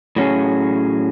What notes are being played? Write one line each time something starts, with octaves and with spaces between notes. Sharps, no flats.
A2 F#3 C#4 G#4